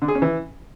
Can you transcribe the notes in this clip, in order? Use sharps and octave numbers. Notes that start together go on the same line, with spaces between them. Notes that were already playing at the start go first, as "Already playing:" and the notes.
D3
G#4
C#4
E3